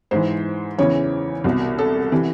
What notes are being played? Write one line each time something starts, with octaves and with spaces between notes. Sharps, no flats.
G#2 E3 C5
E2 C#3 E3 C#5
C2 B2
A4
C3 E3